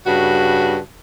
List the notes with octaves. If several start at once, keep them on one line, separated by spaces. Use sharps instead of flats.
G2 C#3 F#4